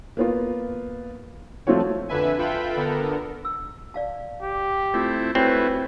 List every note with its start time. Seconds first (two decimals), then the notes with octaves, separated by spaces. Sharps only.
0.17 A#3 B3 F4
1.67 F3 A3 C4 F4 F#4 C#5
2.09 F2 D3 B4 E5 G#5
2.38 F4 A4 B4 E5 G5 B5
2.76 D3 B3 A4 A#4
3.45 E6
3.94 D5 F5 A5
4.43 G4
4.94 A3 C4 E4 F4
5.35 A3 C4 E4 F#4 G4 B4 C#5 G#5